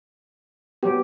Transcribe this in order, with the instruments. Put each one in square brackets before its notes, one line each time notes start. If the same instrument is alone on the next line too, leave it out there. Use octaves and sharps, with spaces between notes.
[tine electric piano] F#3 B3 [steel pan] G4